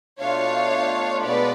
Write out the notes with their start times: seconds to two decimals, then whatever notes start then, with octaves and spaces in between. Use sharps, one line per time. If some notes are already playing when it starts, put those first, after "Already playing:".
0.19 B2 A3 D4 F4 C#5 F5
1.24 B2 G#3 B3 B4 D5